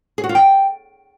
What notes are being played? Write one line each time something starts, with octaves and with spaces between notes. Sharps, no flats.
G#4
F#4
F4
G5